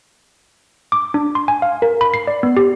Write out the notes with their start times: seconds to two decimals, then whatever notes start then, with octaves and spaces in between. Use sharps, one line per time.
0.92 D6
1.14 D4
1.35 C6
1.48 G#5
1.62 F5
1.82 A#4
2.01 B5
2.14 C7
2.27 D5
2.43 B3
2.57 G4